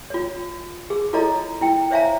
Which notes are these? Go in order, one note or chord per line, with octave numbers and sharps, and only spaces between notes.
F4 C#5
G#4
E4 F4 A4 C#5 D#5 A#5
E4 G5
C5 C#5 E5 F5 G#5 A#5